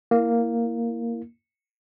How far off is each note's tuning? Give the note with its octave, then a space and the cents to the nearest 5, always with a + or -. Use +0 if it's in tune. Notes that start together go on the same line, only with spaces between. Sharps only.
A#3 +0 E4 +0